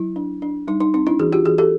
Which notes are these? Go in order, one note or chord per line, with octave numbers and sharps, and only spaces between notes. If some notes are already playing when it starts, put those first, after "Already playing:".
Already playing: F#3 E4
D4
D4
G3 D#4
D#4
C4 D#4
D4 E4
E3 F#4 G#4
F4 G4
E3 F#4 G#4
G4 A4